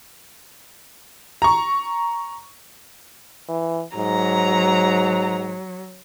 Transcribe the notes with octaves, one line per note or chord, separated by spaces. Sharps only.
A#5 C#6
E3
G#2 F#3 A#5